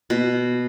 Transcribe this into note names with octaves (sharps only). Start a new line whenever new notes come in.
B2